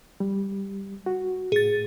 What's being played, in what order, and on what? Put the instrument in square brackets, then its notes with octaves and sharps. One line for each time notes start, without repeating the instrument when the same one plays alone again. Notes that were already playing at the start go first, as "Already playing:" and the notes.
[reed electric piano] G3
F#4
[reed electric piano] A2 [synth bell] G#4 A6